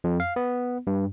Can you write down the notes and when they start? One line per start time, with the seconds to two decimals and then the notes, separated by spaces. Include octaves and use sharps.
0.04 F2
0.20 F5
0.36 B3
0.87 G2